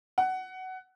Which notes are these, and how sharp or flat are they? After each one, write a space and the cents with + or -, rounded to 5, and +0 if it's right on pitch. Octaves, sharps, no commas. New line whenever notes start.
F#5 +15